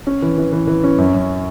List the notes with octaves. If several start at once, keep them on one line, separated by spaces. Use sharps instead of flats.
C#4
E3
E3
E3
E3
C#4
F#2
F#2